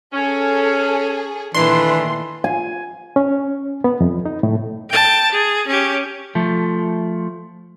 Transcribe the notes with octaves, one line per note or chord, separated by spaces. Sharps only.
C#4 G#4 A4
A#2 D#3 E3 A3 D4 C6
G#5
C#4
B3
F2
D#4
A2
G5 A5
G#4
C#4 G4
F3 A3